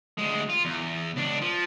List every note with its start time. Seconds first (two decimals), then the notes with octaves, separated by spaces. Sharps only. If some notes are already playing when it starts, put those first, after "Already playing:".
0.19 D2 G#3
0.50 F4
0.65 E2
1.16 C#2 D4
1.41 F3